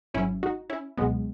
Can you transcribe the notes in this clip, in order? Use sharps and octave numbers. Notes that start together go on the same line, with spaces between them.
G#1 G#2 F#3 C#4 E4
D#4 F#4
C#4 E4
C#2 B2 F#3 G#3 B3